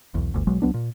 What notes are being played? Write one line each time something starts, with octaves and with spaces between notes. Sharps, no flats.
B1 E2
G1 D2
B1 F#3 G#3
C2 F#3 B3 D4
A#2